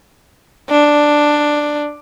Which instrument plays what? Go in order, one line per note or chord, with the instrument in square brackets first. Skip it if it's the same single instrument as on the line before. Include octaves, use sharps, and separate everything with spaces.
[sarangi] D4